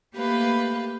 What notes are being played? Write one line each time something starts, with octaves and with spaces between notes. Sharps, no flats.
A3 A#3 G4 B4 F5